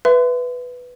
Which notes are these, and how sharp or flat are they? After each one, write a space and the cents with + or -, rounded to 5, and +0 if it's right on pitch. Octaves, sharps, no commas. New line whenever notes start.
B4 +0 E5 +15 C6 -35